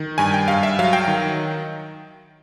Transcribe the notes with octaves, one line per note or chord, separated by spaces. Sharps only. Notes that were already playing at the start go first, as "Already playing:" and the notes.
Already playing: D#3
G2 G#5
G5
G2 F5
E5
F#3 F5
G5
D#3